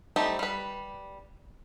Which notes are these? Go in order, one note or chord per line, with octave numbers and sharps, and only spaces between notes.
G3 A3 C4 D#4 G4
G3 B4